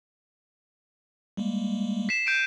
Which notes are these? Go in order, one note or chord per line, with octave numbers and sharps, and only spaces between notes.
G3 G#3 A#3
B6 C7 E7
G6 D7 D#7